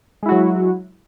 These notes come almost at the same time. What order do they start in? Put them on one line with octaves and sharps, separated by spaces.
G#3 E4 F#4 F#3